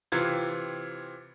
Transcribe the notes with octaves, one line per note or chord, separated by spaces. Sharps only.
C3 E3 F4 G#6